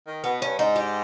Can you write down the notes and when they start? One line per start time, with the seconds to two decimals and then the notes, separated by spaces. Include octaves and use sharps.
0.07 D#3
0.24 B2 B3
0.42 G2 C#4
0.58 G#2 D#4
0.76 G4